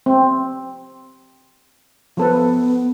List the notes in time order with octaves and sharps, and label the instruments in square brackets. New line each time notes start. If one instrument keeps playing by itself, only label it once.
[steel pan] C4
[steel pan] F3 A4 B4 [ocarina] B3